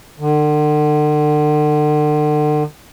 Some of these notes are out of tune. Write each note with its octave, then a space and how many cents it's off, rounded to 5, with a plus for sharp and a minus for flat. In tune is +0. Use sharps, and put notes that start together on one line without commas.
D3 +40